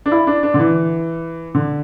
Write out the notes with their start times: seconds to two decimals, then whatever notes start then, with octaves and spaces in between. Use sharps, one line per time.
0.06 D4
0.12 E4
0.27 D4
0.43 D4
0.54 D3
0.59 E3
1.55 D3